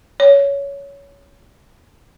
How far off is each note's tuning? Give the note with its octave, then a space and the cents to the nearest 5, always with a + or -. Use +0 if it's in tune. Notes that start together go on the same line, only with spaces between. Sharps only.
C#5 +15